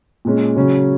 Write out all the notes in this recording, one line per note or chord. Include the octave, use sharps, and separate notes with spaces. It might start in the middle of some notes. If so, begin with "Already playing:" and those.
A#2 G#3 C#4
C#3 F#3 C#4